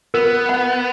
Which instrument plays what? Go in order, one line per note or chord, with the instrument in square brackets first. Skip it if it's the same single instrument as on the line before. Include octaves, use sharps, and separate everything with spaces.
[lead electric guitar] B3 [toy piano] A#4
[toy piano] F#5